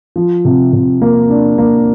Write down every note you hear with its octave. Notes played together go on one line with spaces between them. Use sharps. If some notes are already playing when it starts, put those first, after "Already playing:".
F3
C3
C3
A#3
D4
A#3